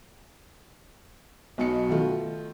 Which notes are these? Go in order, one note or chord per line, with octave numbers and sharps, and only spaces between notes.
B1 B2 D#4 C#7
D#3 A3 F4